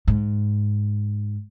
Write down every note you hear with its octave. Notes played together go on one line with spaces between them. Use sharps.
G#2